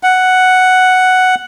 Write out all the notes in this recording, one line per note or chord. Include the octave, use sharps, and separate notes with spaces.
F#5